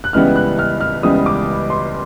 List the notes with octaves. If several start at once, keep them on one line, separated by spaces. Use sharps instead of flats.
F#6
C#2 C#3 E3 G3 B3 F6
F#6
F6
F6
C#2 C#3 E3 G3 B3 D#6
D6
C6